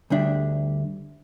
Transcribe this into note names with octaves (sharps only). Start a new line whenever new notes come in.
D2 G3 D4 E5